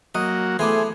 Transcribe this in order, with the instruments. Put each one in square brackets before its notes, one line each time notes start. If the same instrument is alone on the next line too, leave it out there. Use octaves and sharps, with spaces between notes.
[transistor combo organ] F#3 A#3 F#4 [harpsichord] D#5
[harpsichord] E3 B3 [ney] A3 [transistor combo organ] G#4 C5 [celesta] A4 A5 D6